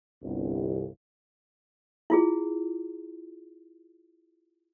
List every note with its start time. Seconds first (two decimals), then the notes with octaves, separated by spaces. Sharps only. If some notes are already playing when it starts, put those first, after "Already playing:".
0.23 G1 C2
2.10 E4 F4 G#4